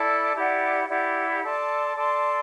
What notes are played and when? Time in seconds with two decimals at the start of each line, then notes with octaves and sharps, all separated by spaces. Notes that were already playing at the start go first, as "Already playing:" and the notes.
Already playing: E4 A4 D5 A5
0.35 E4 G4 D5 F#5
0.89 E4 G4 D5 F#5
1.43 A4 D5 A5 C6
1.97 A4 D5 A5 C6